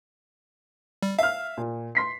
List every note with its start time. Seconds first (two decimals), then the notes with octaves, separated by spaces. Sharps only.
1.03 G3
1.19 E5 F5 F6
1.57 A#2
1.95 C6 B6 C7